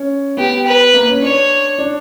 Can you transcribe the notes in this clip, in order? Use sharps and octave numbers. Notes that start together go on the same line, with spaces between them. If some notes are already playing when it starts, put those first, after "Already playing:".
Already playing: C#4
B3 G4
B4
A#3
C#4
D4 C#5
D4